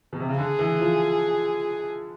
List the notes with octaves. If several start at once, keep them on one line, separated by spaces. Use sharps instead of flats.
B2
C3
C#3
D3 G#4
E3
F3